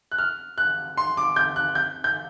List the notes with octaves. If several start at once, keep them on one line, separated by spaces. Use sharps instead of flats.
F#6
F6
F#6
C6
D6
G6
F#6
G6
G6